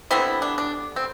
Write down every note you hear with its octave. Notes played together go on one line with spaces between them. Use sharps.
D3 G3 B3 C4 E4
D4
D4
C4